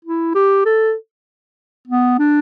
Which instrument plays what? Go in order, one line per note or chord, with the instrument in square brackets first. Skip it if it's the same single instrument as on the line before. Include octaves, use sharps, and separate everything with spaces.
[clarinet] E4
G4
A4
B3
D4